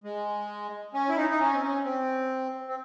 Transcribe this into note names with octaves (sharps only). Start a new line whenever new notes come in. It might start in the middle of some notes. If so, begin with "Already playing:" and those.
G#3
C#4
E4
D#4
D#4
C#4
C4
C#4
C4
C4